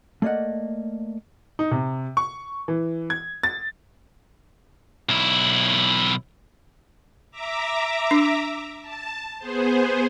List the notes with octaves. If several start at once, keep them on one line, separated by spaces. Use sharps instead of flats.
A3 A#3 D5 D#5 F#5
D#4
C3
C#6
E3
G#6
A6
B1 E4
E5 A#5 D6
D4
A5
B3 G#4 C5